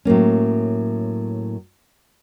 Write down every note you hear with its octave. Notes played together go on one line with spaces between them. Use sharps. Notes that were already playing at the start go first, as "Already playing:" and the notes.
A2 F#3 A#3 C#4